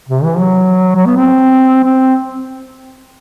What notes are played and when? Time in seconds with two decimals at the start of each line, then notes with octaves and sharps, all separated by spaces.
0.09 C3
0.24 E3
0.39 F#3
0.96 F#3
1.06 B3
1.16 C4
1.84 C4